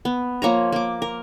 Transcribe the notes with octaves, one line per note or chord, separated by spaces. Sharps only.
B3
F3 A#3 C#5 A#5
A#3 D6
A#4